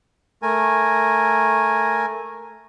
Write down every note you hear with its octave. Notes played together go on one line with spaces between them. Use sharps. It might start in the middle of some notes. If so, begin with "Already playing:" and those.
A3 A#4 G#5